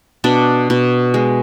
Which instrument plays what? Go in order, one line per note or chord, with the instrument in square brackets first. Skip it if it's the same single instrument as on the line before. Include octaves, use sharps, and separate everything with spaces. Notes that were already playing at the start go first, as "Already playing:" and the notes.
[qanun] B2 D4
B2
G#3